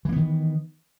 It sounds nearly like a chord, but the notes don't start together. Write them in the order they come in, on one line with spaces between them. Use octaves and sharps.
E3 A#3 B3 D#3